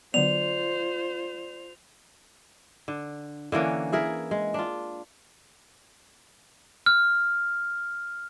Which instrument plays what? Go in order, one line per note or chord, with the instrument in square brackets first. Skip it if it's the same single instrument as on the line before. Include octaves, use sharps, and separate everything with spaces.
[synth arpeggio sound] D3 F#3 B3 [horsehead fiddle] F4 C5 [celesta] D5 [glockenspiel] F7
[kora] D3
D3 E3 A#3 C#4
E4 G#4 A#4 E5
G#3
D4 F4
[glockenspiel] F6